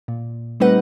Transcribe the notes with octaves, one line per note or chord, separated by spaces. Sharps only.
A#2
G3 A3 C4 D#4 B4 F#5